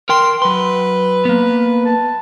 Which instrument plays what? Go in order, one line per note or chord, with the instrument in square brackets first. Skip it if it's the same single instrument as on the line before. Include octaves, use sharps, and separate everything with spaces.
[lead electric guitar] A#4 G5 [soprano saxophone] C6
[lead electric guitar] F#3 C6 [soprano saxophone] B4
[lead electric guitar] A#3 B3
[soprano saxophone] A5